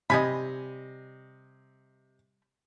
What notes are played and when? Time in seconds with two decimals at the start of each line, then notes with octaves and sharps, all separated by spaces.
0.10 C3 G3 D#5 G#5 B5